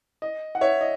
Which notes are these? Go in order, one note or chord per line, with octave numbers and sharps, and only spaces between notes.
D#5
F#5
C#5 E5
D#5